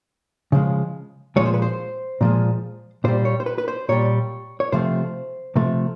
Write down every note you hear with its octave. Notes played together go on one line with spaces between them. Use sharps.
C#3 F3 G#3
A#2 F3 G#3 C#5
C5
B4
C5
A#2 F3 G#3
A#2 G3 C5
C#5
C5
B4
B4
C5
A#2 G3 C#5
C#5
C3 F3 A3 C5
C3 F3 A3